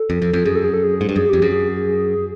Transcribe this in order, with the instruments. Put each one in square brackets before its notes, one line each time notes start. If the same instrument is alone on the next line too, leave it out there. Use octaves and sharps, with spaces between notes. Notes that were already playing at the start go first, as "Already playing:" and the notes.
Already playing: [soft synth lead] A4
[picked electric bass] F2
F2
F2
[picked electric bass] F#2 [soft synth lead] G#4
[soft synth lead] A4
G#4
A4
G#4
[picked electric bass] G#2
G2
[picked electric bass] F#2 [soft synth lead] G#4
[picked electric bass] F2 [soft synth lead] G4
[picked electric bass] F#2 [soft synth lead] G#4